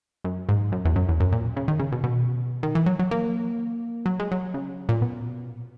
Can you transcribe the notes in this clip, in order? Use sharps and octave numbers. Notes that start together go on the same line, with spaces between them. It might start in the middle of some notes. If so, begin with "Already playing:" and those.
F#2
G#2
F#2
E2
F#2
E2
F#2
A#2
C#3
D#3
C#3
B2
B2
D#3
E3
F#3
F#3
A#3
F#3
G#3
F#3
C#3
A#2
B2